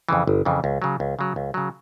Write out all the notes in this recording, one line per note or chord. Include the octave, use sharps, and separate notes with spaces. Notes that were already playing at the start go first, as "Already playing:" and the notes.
F2 C#3 E3
G1
F2 C#3 E3
C#2
C#3 F#3
C#2
C#3 F#3
C#2
C#3 F#3